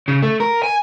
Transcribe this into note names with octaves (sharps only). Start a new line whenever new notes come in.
C#3
A3
A#4
G#5